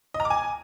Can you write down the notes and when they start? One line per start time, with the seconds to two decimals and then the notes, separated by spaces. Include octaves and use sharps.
0.14 D#5
0.20 A#5
0.25 D6
0.30 G#5